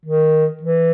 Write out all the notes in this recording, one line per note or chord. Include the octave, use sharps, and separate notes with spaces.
D#3
E3